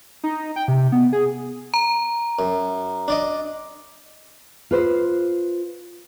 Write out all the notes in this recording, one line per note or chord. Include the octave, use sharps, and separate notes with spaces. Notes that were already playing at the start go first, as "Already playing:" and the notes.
D#4
G5
C3
B3
G#4
A#5
F#2
D4 D5 D#5
F4 B4 C5